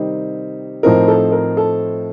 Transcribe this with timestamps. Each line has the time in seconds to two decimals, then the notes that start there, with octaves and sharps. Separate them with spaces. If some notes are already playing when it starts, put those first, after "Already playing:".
Already playing: C3 D#3 G3 C4 D#4
0.83 A2 F3 C4 D#4 A#4
1.08 A4
1.32 A#4
1.57 A4